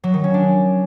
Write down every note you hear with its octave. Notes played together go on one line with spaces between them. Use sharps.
F#3
D#3
C#4
D4